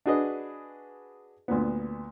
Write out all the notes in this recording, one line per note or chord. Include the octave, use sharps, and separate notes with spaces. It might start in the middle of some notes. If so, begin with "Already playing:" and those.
D4 F#4 G#4 B4 D#5
D2 A#2 B3